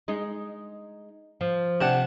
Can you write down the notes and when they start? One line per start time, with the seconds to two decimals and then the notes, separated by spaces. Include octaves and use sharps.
0.08 G#3 D#4
1.41 F3
1.81 C3 D4 F#5